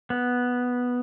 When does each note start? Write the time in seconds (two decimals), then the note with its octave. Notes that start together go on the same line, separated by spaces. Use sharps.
0.10 B3